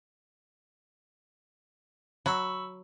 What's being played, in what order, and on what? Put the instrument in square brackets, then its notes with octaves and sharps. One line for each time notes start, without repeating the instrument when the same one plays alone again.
[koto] F#3 [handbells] B5 C#6 E6